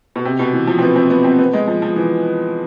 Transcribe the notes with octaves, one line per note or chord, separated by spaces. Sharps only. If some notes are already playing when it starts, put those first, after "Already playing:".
B2
C3
B2
E3
F3
C4
B3
C4
B3
C4
B3
G#3
F3
F3
E3